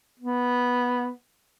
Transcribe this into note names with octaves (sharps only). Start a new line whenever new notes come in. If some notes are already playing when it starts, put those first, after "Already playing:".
B3